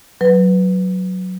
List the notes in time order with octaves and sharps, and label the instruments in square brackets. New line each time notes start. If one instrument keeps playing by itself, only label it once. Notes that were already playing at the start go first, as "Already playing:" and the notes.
[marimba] F#3 B4